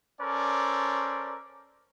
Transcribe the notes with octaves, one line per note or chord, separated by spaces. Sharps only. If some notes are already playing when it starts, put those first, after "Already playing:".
C#4 A4 A#4 C5 D5